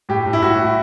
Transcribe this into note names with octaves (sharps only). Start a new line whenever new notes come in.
A2 G4
A2
E4
A2 F#4